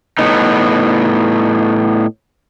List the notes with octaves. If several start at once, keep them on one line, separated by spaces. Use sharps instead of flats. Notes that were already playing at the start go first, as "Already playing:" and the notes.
A2 B3 D#4